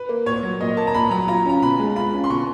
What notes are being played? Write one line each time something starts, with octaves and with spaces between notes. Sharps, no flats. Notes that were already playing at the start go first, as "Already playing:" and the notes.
Already playing: B4
A#3
A#2 C#5
F#3
A#2 D#5
A#3 A5
A#5
A#2 B5
F#3 A#5
F4 A#5
C#4 A#5
B2 B5
G#3
F4 B5
C#4
C6
B2 C#6